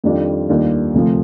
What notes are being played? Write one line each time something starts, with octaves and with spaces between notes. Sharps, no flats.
F2 D#3 G3 D4 F4
D#2 D#3 G3 D4 F4
D2 C3 F3